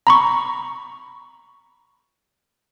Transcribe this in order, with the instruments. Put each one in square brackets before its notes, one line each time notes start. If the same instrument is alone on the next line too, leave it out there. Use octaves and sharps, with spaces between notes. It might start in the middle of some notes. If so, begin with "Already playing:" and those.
[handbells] A#5 B5 C#6